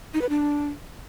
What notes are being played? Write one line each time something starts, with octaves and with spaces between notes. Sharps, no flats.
D#4
B4
D4